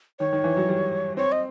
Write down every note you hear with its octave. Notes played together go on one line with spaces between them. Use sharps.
D#3 C#5
D#3
E3
F#3
G3
C4 C#5
D#5